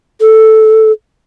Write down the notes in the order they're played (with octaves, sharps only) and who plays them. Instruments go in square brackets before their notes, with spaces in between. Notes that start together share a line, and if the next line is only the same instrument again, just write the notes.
[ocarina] A4